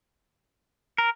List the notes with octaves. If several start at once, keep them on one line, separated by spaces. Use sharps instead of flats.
A#4